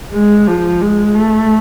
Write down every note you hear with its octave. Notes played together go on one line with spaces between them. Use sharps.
G#3
F3
G#3
A3